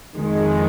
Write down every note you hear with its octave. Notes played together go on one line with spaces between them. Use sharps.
F2 D#3 G#3